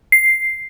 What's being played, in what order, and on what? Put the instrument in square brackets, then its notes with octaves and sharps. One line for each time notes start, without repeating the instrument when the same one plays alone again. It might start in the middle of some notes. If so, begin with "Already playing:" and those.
[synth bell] C7